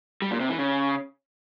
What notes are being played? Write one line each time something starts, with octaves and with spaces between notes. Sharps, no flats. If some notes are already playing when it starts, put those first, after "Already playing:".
G3
A#2
C3
E3
C#3